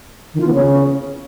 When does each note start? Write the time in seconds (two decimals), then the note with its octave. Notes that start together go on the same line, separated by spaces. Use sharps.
0.34 D#3
0.40 F4
0.47 B3
0.53 C#3